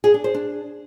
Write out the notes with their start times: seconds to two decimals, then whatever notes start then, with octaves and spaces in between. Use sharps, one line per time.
0.04 G#4
0.14 D4
0.24 C5
0.34 D4